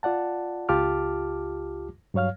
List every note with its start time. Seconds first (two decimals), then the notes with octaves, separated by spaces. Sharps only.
0.03 F4 D5 F#5 A5
0.69 C#2 F4 G4 A5 D6 F6
2.14 G2 F#3 C#5 F5 F6